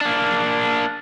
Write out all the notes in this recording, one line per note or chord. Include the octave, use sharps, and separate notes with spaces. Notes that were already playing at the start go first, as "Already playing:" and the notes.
A#3 D4